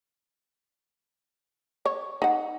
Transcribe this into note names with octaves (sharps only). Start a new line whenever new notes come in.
C#5
D#4 F#5